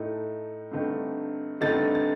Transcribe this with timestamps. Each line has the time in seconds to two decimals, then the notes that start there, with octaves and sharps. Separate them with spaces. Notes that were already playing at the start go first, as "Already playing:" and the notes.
Already playing: A2 A3 D#4
0.71 G2 D3 A3 C4 D#4
1.61 G2 D3 A3 C4 D#4 A6
1.95 A6